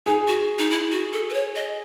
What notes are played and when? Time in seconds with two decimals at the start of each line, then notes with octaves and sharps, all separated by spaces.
0.06 D#4 G#4
0.27 F#4
0.59 D#4
0.70 E4
0.92 F#4
1.13 A4
1.30 B4
1.34 C#5
1.56 D#5